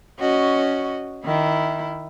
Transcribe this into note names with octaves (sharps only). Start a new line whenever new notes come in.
C#4 F#4 D#5
D#3 E4